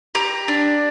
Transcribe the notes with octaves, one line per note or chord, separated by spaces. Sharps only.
G4 A#5
D4